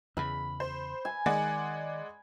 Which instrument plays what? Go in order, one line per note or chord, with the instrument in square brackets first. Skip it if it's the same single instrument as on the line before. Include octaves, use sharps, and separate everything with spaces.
[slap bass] E2 C#3 [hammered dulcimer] B5
[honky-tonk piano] C5
[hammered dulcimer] G#5
[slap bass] D#3 [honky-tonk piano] G#3 D5 F#5